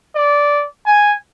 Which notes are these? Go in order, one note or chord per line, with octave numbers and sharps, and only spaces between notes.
D5
G#5